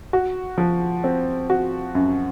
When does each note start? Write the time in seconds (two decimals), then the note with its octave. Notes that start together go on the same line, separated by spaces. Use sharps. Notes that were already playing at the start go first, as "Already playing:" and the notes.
0.13 F#4
0.58 F3
1.04 C4
1.50 F#4
1.95 F#2